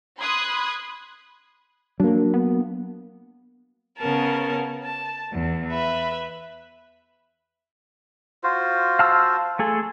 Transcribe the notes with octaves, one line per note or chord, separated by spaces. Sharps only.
B5 C6 D#6 F#6 G#6
F#3 A#3 D4
B3
C#3 B3 C#4 A#4 A5
A5
E2
B4 E5 B5
F4 F#4 C5
F5 A5 E6
A3 G#4 A4